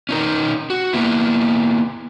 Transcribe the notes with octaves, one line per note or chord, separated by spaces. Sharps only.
C#4 D#4 A#4
F#4
A#3 B3 E4